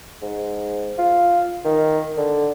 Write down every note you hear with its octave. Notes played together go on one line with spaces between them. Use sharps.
G#2
F4
D#3
D3